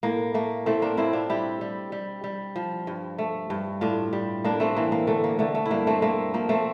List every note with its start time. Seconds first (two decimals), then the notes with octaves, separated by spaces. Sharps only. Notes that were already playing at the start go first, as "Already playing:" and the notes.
0.03 A2 A#3
0.34 A3 A#3
0.66 A2 A3 C4
0.82 A#3 D4
0.97 A2 C4 E4
1.13 D4 F4
1.30 G3 E4 G4
1.61 G3
1.92 G3
2.24 G3
2.56 F3
2.87 G2
3.18 A3
3.50 G2
3.81 A2 D4 F4
4.13 G3
4.44 A2 A#3 D4
4.60 A3 C4
4.76 E3 A#3
4.92 A#3
5.07 D3 A3
5.24 A#3
5.39 D3 A3
5.55 A3
5.65 E4
5.71 G2 A#3 D4
5.87 A3 C4
6.02 A3 A#3
6.34 F3 A#3
6.49 A3 C4